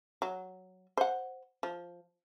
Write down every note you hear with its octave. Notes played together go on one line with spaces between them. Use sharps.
F#3
C5 F#5
F3